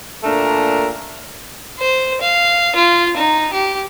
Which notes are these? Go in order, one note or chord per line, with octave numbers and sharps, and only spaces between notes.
A#2 A3 D4 A#4
C5
F5
F4
D#4
G4